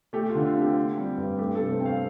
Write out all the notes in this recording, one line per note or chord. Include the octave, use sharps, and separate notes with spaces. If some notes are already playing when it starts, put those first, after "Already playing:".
A3 G4
F4
D3
F4
C4
G4
C4
G3
G2
A3 G4
A4
C3
C5
C4 G5
F5